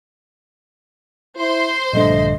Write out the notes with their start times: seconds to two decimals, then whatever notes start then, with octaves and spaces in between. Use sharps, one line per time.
1.37 E4 C5 C6
1.93 A#1 G2 D3 A3 D#5